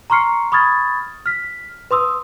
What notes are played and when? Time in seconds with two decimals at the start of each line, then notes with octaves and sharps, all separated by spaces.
0.10 A#5 C6 C#6 F6 C7 C#7
0.52 B5 C#6 D#6 F6 G#6 A6
1.26 F6 B6
1.91 B4 C6 D#6 E6